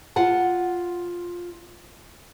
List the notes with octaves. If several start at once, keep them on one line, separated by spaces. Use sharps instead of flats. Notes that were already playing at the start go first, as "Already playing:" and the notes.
F4 F#5 A5